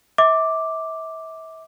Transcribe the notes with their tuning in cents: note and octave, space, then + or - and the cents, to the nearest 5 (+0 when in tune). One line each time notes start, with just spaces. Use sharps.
E5 -35 D6 +0